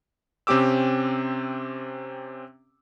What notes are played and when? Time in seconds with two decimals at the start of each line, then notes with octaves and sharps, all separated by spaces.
0.47 C3 C4 C#4 G4 D6 E6